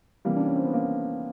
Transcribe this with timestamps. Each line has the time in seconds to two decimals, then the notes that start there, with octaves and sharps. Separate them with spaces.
0.25 C3 E3 G3 A#3
0.36 D4
0.46 C#4
0.55 C4
0.64 B3
0.74 A#3